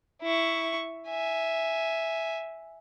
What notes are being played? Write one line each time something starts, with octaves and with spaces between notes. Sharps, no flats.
E4 C#6
E5 G#5